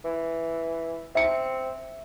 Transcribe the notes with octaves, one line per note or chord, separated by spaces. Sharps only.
E3
C4 E5 C#7